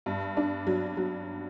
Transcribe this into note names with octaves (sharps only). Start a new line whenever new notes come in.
G2
D4
F#3
F#3